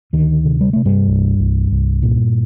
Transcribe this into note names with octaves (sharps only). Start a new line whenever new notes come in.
D2 D#3
C3
G3
C3 A3
G2 G3
C2
C2
C2
A#2